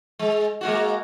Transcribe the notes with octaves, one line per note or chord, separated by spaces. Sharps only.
G#3
G#3 A#3 F#4